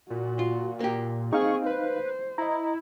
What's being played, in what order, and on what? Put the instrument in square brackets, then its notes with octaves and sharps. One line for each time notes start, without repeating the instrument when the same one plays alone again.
[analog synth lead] A#2 [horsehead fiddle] F#4
[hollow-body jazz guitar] F4
A#3 G4
[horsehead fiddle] C4 G#4 [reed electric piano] D#4 F5 [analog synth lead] C#6
[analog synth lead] B4 [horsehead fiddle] C5
[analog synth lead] E4 [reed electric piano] D#5 A#5